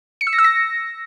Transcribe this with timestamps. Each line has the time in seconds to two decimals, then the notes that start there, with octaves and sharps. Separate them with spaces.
0.21 C#7
0.27 E6
0.33 A#6
0.39 E6
0.44 A#6